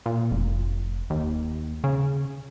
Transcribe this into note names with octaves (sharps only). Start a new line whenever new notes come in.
A#2
F1
D#2
C#3